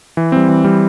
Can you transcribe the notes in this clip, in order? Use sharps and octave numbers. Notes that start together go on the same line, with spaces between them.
E3
G3 C4
E3
G3 C4